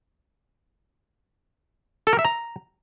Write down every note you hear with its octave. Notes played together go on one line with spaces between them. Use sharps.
A4
A#4
E5
A#5